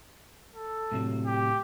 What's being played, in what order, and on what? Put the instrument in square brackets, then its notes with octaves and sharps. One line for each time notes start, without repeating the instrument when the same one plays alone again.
[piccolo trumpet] A4
[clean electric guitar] A2 C3 F#3
[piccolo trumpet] G4